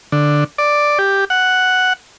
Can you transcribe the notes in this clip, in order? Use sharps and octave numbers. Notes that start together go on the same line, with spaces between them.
D3
D5
G4
F#5